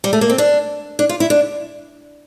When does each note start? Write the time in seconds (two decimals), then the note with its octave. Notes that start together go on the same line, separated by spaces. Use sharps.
0.04 G3
0.13 A3
0.21 A#3
0.30 C4
0.38 D4
0.99 D4
1.09 F4
1.20 E4
1.30 D4